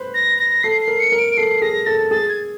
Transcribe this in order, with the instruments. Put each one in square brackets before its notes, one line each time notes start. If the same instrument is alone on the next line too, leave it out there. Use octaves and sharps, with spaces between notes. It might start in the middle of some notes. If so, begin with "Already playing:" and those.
Already playing: [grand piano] B4 C5
[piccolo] A#6
A#6
[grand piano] A4 [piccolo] C7
[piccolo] C7
[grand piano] A#4
[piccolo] C#7
[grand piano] A#4
[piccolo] D7
[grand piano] A4 [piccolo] C7
[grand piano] G#4 [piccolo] A#6
[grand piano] A4 [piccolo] A6
[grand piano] G#4 [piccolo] A6
[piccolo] G#6